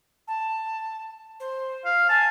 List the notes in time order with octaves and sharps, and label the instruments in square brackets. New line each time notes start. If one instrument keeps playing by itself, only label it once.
[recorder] A5
C5
[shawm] F5
[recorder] G#5 [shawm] A5